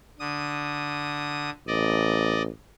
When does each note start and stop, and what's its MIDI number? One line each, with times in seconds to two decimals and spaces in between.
0.19 1.50 50
0.19 1.50 87
1.67 2.49 33
1.67 2.42 74
1.67 2.42 75